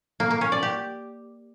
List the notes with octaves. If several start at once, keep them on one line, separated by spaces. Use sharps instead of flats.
A#3
A#3
C#4
D5
G4